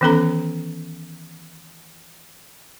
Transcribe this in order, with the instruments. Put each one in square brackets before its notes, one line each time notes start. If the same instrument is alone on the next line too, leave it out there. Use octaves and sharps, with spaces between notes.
[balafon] D#3 E3 B3 C#4 A4 A#5